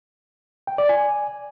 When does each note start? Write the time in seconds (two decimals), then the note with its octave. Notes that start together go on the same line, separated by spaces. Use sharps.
0.67 G5
0.78 D5
0.89 G#5